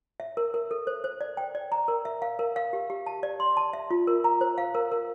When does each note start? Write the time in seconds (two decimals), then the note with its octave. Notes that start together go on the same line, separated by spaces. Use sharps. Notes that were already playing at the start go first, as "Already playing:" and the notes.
0.20 E5
0.37 A#4
0.54 A#4
0.71 A4
0.87 C5
1.04 C5
1.21 D5
1.37 G5
1.55 D5
1.72 A#5
1.88 A#4
2.05 E5
2.22 F5
2.39 A#4
2.56 F5
2.73 G4
2.90 G4
3.06 A5
3.23 D5
3.40 C6
3.57 A5
3.73 E5
3.91 F4
4.07 A#4
4.24 A#5
4.41 C5
4.58 F5
4.75 A#4
4.92 A#4